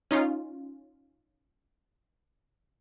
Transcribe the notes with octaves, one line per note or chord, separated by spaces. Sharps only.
C#4 D#4 F4